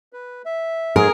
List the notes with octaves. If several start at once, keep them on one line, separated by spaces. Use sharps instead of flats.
B4
E5
G#2 G#4 A#4